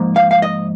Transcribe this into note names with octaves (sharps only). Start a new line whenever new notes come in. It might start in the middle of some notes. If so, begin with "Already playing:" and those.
Already playing: G#2 F3 A#3
F5
F5
D#5